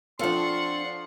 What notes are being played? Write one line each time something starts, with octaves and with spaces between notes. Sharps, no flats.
F3 C4 D4 F4 A4 F#5 C6 C#6